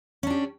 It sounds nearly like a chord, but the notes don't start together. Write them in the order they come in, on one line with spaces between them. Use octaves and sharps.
C#4 D4 G4